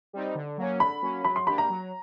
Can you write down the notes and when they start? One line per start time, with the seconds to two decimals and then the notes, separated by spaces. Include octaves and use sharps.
0.13 G3 C4 D#4
0.35 D3
0.57 F#3 A#3 C#4
0.80 D3 B5
1.02 F#3 A#3 C#4
1.24 F#3 B5
1.36 C6
1.47 A#3 D4 G4 B5
1.58 A#5
1.70 F#3